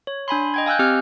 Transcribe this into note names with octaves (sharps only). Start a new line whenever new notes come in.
C#5
D4 G#5 B5 C6
D#5 G5 G#6
F5 G#5 E6 F#6 G6
C4 G4 D#5 F6 F#6